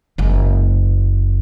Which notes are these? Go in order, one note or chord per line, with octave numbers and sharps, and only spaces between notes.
F#1 G#3